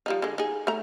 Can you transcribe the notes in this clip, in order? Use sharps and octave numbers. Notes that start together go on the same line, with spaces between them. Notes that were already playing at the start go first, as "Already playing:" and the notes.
F3 G3 D#4
D3 G#3
D#4 G#4
A3 A#5